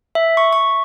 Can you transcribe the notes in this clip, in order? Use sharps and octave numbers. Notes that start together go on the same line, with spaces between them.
E5
C#6
C#6